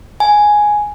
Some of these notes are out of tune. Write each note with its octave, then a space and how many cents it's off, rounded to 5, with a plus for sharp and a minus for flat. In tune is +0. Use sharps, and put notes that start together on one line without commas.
G#5 +5